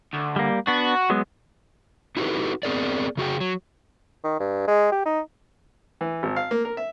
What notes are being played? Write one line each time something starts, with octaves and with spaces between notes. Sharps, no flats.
D2
G3 A#3
B3 D4 F#4
F#3 G#3 B3
D#4 E4 F#4 G4 A4 B4
B3 C4 G#4 A#4 D5
C#3 F#4 G#4 G5
F#3
D#3
G2
G#3
G4
D#4
E3
G#1
F5
A#3
A#4
E5